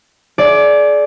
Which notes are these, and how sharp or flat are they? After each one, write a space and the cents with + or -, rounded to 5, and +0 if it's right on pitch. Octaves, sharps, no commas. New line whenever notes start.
G#4 +35 D5 -5